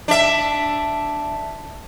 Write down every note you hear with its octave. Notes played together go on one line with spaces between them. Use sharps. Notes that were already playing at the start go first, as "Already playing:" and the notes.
D4 E5